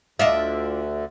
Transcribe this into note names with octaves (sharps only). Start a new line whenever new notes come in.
D2 D3 D4 F4 D#5 E5